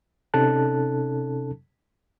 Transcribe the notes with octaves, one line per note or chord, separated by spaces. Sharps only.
C3 C#4 D#4 A4 A5 F#6